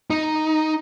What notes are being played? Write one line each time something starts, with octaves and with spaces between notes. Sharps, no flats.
D#4